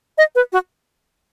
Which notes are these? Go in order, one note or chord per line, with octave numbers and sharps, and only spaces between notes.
D#5
B4
F#4